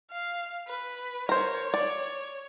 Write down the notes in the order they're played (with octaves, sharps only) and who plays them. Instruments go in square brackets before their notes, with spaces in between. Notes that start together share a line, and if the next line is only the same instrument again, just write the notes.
[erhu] F5
B4
[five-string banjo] A#4 C5 [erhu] C#5
[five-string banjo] D5